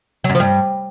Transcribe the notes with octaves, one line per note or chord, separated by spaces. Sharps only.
F#3
F#2
F3
G2